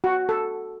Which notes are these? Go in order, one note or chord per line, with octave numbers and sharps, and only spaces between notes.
F#4
A4